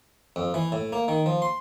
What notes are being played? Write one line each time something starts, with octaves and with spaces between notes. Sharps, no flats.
F2
E3
A2
A#3
D#3
F3
C6